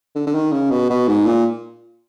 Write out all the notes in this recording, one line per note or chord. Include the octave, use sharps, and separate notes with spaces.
D3
D3
D#3
C#3
B2
B2
G#2
A#2